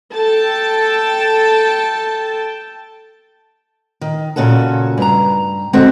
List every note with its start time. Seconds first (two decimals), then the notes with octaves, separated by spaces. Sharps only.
0.16 A4 G5 A5
4.01 D#3
4.36 A#2 C#3 C#4 F#4 A4
4.98 G2 A#5
5.73 D3 G#3 C4 F#4 A4